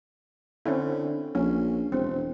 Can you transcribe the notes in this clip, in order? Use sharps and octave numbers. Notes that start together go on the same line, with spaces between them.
D3 C4 C#4 E4
A#1 C#4
E1 C4